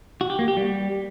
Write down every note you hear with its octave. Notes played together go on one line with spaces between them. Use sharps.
F#4
G4
A#3
G4
G3